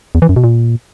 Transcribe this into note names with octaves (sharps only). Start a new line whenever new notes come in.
E2
E3
F#2
B2
A#2